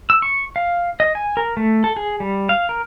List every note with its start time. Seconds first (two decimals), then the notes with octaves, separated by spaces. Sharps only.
0.10 E6
0.22 C#6
0.56 F5
1.00 D#5
1.15 G#5
1.37 A#4
1.57 A3
1.84 A4
1.97 G#4
2.20 G3
2.49 F5
2.69 A#4